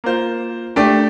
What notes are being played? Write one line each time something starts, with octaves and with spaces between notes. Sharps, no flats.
A#3 F4 C5
A3 D4 G4